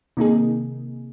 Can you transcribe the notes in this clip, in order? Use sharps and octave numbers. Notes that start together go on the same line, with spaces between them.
C3 D#3 A#3 D#4 G#4